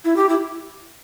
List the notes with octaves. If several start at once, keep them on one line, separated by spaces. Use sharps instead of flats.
E4
G4
E4